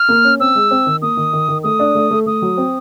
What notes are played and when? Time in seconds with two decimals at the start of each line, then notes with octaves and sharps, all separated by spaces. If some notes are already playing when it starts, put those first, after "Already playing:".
Already playing: F6
0.09 A#3
0.24 C#4
0.40 C4 E6
0.55 G#3
0.71 C4
0.86 D#3
1.02 A#3 D#6
1.17 D#3
1.33 D#3
1.48 D#3
1.63 A3 D#6
1.79 D4
1.95 A3
2.11 A3
2.26 A3 D#6
2.42 F#3
2.57 C4